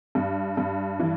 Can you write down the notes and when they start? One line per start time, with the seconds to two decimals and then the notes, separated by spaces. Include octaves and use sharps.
0.15 G2
0.57 G2
0.99 E3